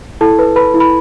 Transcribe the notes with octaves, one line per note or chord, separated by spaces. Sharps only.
E4 A4 A5
B4
B4 B5
E4
B5